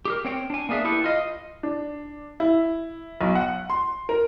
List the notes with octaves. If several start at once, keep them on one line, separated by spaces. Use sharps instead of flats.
G4 G#4 A#4
C4 C#5 G5
D4 G#5
A#3 B3 D4 G#4 E5
E4 G4 A4 B4
F4 D#5
D4
E4
B1
F#5
C6
A#4